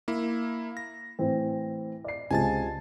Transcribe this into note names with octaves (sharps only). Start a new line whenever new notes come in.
A#3 E4
A#6
A2 E3 C4
D5 C7
C#2 C3 G#3 G#5 A5 A6